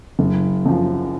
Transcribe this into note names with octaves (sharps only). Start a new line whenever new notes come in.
F#1
F#2 F3